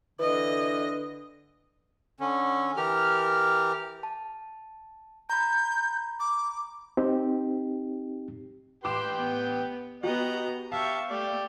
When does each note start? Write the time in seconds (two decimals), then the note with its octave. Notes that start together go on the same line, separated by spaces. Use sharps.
0.20 D3 E3 D#5
2.20 D3 C#4
2.77 E3 G4 A#4 F6
4.03 A5
5.30 A#5 B5 G6
6.20 D6
6.97 C4 D#4 G4
8.84 A1 G4 B4 G5 C6 D6 E7
9.18 B3
10.03 B3 F#4 G4 D#5 F#5 A#5
10.72 G4 E5 F5 A5 C#6
11.10 A3 G4 D5